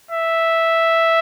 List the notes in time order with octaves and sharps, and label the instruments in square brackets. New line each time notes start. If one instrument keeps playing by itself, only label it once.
[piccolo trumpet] E5